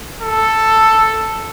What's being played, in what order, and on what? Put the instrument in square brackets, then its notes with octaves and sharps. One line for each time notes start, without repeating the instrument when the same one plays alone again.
[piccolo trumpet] A4